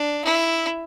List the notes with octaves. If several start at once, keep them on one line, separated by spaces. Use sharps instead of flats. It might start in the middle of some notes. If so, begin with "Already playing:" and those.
Already playing: D4
E4